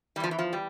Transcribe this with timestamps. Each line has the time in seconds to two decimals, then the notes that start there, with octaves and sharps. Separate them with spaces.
0.16 E3 G3
0.20 E2 F3
0.31 E3
0.39 F3
0.53 G3